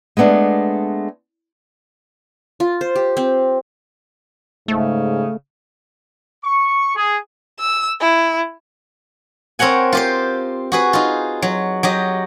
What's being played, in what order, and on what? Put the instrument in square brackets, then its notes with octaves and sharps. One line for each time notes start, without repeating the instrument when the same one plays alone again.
[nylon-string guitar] G#3 A3 B3 D4
[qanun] F4
C5
G4
C4
[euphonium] G#2 [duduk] C#3 [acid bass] A3
[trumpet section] C#6
G#4
[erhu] E6
E4
[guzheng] C4 A#4 C#5 F#5 G#5
F4 G4 C5
F#4 G#4 B4
D#4 F4
F#3
F#3 G4 D#5